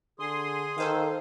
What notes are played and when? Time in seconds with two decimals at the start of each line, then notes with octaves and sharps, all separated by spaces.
0.19 D3 G#4 C6 D#6
0.78 D#3 A4 C5 F5